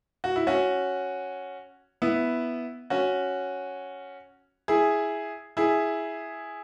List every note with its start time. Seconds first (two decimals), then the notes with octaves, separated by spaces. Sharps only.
0.24 F#4
0.36 E4
0.47 C#4 F#4
2.02 B3 E4
2.90 C#4 F#4
4.68 E4 G#4
5.57 E4 G#4